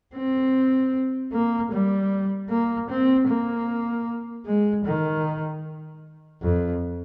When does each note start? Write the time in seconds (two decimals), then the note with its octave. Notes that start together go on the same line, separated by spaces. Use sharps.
0.14 C4
1.33 A#3
1.72 G3
2.50 A#3
2.90 C4
3.28 A#3
4.46 G#3
4.85 D#3
6.42 F2